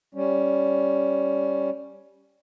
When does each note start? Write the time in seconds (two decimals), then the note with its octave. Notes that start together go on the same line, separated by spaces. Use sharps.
0.14 G3 C#4